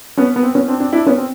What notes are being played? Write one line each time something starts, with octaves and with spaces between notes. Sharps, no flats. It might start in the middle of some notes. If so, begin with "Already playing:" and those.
B3 C#4
B3
C4
B3 C#4
C4 D4
C4 D4
D4 E4
B3 C#4
C4